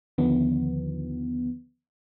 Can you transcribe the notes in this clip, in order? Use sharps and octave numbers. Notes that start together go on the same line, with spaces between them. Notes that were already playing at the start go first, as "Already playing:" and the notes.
D#2 D3 D#3 F3 B3